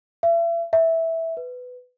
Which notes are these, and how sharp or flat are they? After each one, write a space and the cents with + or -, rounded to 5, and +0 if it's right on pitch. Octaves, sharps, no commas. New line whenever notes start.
E5 +40
E5 -10
B4 +15